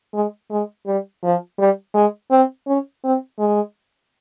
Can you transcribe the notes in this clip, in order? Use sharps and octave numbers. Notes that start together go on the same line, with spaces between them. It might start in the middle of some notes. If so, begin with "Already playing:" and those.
G#3
G#3
G3
F3
G3
G#3
C4
C#4
C4
G#3